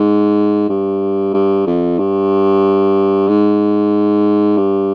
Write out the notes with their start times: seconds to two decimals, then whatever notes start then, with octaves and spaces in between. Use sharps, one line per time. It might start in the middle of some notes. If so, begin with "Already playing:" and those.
Already playing: G#2
0.69 G2
1.34 G2
1.67 F2
1.99 G2
3.28 G#2
4.57 G2